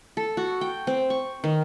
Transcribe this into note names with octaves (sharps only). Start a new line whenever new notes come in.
A4
F#4
G5
C4
C#6
D#3